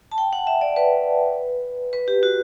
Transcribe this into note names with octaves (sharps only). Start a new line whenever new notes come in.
A5
G5
F#5
E5
D5
B4
B4
G4
F#4